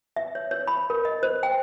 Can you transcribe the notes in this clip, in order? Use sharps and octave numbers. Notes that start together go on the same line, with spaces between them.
E5
C#5
C#5
B5
A#4
D#5
C5
G5